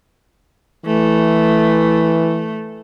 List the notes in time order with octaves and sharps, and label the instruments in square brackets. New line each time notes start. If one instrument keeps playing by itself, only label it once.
[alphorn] E3 [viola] A3